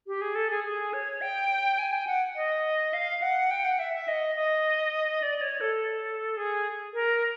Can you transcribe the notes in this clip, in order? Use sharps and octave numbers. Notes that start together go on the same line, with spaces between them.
G4
G#4
A4
G#4
G#4
C#5
G5
G#5
G5
F#5
D#5
F5
F#5
G5
F#5
E5
E5
D#5
D#5
D5
C#5
A4
G#4
A#4